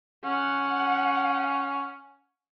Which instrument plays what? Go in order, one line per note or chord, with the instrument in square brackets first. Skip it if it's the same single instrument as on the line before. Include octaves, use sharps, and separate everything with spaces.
[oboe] C#4 [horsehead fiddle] F#5